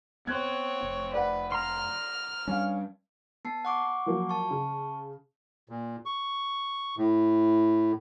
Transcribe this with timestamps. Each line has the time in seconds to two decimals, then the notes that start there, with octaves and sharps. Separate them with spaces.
0.27 B3 C4 C#5 F#6 G#6
0.83 F1
1.14 B4 D5 F#5
1.52 A#5 C6 F6
2.47 G3 C#4 D4 F5
3.45 B3 A5 C7
3.65 F#5 C#6 D6
4.06 F3 F#3 A#3
4.29 A5 C#6
4.50 C#3
5.69 A#2
6.06 C#6
6.98 A2